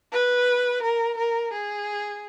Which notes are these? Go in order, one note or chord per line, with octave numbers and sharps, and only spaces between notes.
B4
A#4
A#4
G#4